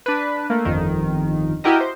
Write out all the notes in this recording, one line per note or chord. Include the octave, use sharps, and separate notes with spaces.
D4 B4
A3 A#3
G1 F2 D#3
E4 F#4 G4 A#4 D#5
C5